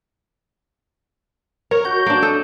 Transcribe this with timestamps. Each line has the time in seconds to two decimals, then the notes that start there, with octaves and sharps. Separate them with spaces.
1.71 A#4 C#5
1.85 F#4 G6
2.06 A#3 D4 A5
2.22 A4 D#5